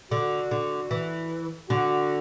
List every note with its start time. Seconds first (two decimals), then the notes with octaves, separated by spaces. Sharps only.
0.11 D3 F#4
0.51 D3
0.91 E3
1.70 D3 F#4